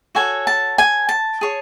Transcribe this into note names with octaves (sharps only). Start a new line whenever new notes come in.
F#4 A4 C#5 G#5
A5
G#5
A5
G#4 C#5